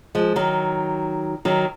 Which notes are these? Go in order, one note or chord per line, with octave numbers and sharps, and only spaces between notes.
F3 G#3
D#3 F#3
D#3 F#3